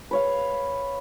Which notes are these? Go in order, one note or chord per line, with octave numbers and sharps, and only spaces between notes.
B4 C#5 F5